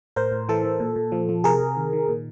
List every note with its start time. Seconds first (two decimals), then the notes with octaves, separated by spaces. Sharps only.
0.16 A2 A#4 C5
0.32 A2
0.49 E3 A4
0.64 E3
0.80 A#2
0.96 A#2
1.12 F3
1.29 F3
1.44 C3 G#4 A#4
1.60 C3
1.77 D#3
1.93 D#3
2.09 A#2